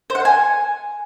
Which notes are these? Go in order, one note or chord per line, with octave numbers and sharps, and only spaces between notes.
C5
F#5
C5
G#5